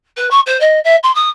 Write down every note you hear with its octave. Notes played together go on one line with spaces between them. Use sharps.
B4
C#6
C5
D#5
E5
C6
D#6